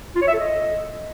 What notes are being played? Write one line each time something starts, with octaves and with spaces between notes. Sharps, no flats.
F4
C#5
E5
A4
D#5